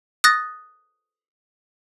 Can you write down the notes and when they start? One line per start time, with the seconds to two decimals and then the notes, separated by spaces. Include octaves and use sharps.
0.24 D#6 F#6 A6 A#6